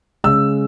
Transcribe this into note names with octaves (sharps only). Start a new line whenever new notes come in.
C#3 G#3 E6